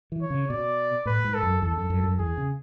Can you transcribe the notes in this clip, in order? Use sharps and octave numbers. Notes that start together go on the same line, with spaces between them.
E3
C#5
C#3
B2 D5
A2 B4
G#2
A4
F#2
E2 A4
F#2
F#2
F#2
E2 G#4
C#3